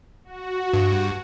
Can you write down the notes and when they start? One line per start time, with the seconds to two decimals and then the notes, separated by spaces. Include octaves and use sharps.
0.24 F#4
0.73 G2